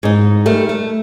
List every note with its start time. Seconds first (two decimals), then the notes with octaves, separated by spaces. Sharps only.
0.03 G#2 D#4
0.46 G3 A3 A#4
0.69 A3